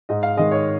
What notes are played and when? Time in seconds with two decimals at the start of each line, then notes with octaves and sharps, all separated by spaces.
0.09 G#2 D#5
0.23 F5
0.37 D#3 G#3 D#5
0.51 C#5